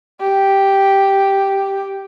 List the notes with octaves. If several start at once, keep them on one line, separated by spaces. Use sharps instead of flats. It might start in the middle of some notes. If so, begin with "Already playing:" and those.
G4